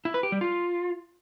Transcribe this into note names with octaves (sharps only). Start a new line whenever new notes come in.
E4
B4
G4
G3
F4